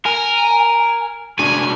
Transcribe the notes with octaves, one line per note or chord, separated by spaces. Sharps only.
A#4 G#5
G#3 D4 F#4 G#5